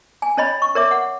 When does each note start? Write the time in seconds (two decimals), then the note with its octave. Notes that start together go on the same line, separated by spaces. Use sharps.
0.22 G#5
0.37 C#4 C#5 D#5 B5
0.62 C#6
0.75 A#4 C#5 E5 D6
0.91 F#5